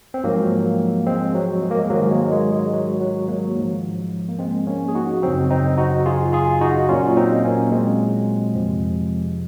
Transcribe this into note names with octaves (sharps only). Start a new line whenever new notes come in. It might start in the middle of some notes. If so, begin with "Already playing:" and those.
C4
G#2 F3 F#3 A#3
G#3 C4
F#3
G#3
A#3
G#3
G#2 D#3 F#3 A#3
G#3
G#3
G#3
F#3
F#3
F#3 A#3
G#2 F3
A#3
G#3 C4
A#3 C#4
G#4
D#4 F#4
F#2 C#3 F#3 C4 D#4
C4 D#4
D#4 F#4
F4 G#4
F4 G#4
D#4 F#4
A#2 F#3 C#4 F4
C4 D#4
A#3 C#4
G#3 C4
F2 C3 F3